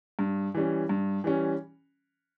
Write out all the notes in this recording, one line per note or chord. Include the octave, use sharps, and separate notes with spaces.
G2
E3 G3 C#4
G2
E3 G3 C#4